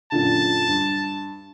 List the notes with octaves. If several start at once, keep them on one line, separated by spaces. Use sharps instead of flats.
F#2 A#2 D3 A5
G2